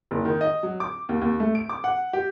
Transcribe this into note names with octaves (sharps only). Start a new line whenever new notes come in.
F#1
D#3
D#5
F#3
D6
D#2
D#2
A3
D7
D6
F#5
G4